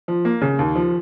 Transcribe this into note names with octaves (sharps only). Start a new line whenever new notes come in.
F3
A#3
C#3
D#2
F3